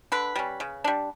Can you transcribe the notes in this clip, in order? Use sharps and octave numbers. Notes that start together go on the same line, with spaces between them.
D3 B4
G3 C#4
C#3
G3 D4